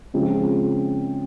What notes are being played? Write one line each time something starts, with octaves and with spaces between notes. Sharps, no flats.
C#3 F3 G#3 C4